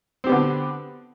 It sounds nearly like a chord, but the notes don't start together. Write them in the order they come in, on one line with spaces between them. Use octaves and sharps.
C4 G4 B3 D3